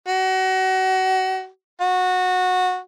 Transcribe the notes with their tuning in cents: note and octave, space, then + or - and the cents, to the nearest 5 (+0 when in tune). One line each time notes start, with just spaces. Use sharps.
F#4 +30
F#4 -15